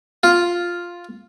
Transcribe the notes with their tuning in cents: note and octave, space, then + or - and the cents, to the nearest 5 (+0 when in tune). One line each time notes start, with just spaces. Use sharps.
F4 +0